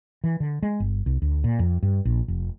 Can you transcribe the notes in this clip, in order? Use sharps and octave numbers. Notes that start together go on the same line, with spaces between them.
E3
D3
G#3
G1
C2
D2
A#2
F2
G2
A#1
F1